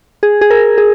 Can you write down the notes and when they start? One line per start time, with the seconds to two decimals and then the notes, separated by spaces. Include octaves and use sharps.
0.23 G#4
0.41 G#4
0.50 A#4
0.78 G#4